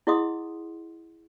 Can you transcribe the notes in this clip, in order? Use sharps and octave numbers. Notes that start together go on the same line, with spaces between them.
E4 G#4 D#5 F#5 C6 D#6